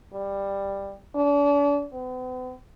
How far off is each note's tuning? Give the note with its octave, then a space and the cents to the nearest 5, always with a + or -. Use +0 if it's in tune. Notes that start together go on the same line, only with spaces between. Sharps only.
G3 +10
D4 -40
B3 +45